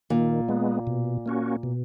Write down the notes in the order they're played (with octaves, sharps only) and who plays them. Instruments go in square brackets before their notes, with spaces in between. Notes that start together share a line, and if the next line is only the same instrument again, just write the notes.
[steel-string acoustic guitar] A#2 [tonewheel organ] D#3
[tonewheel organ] G#3 B3
B2
A#3 C#4 F#4
B2